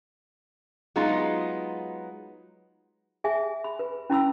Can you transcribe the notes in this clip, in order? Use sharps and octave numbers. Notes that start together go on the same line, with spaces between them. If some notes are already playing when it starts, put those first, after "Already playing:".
F#3 G#3 B3 D#4 F4
G#4 E5 G#5
B5
B4
C#4 E4 B5 E6